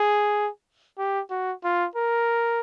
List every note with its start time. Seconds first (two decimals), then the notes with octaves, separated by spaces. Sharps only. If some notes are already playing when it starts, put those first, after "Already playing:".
Already playing: G#4
0.98 G4
1.30 F#4
1.64 F4
1.96 A#4